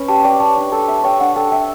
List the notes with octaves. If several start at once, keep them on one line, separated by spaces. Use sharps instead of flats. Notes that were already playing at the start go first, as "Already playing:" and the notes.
Already playing: C#4 B4
G4 A5
D5 G5
C#5 A5
D4
A4 A5
E5 A5
C#5 G5
D4 F#5
A4 G5
E5 G5